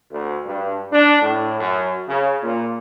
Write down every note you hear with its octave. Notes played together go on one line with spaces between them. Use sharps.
D2
G2
D4
A2
F#2
C#3
A#2